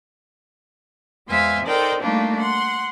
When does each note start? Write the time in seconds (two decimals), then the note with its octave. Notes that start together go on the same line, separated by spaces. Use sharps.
1.26 E2 G#3 C5 E5 F5 G#5
1.65 D#4 A4 A#4 C5 D5 G5
2.01 G3 A3 A#3 D4 D#4 F4
2.39 F#5 C6